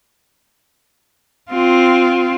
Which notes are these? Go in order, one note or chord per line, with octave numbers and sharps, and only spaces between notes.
C4 F4